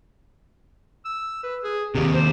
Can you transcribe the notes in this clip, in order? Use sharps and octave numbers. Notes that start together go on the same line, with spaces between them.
E6
B4
G#4
D#2 C3 G4
C5